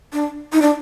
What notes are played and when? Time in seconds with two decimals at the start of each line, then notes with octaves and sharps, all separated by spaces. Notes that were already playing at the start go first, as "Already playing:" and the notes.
0.13 D4
0.53 D#4
0.62 D4